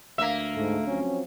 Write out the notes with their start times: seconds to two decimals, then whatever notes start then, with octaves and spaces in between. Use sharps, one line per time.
0.18 D2 A#3 E5
0.56 G#2 A3
0.87 F3 F#3 C4 C#4